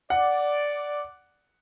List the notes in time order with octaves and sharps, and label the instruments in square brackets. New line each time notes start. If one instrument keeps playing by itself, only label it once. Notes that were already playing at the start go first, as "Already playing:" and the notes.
[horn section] D5 [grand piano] F#5